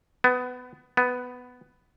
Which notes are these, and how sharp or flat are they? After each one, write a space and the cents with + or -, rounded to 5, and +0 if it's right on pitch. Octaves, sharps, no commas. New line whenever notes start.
B3 +20
B3 +10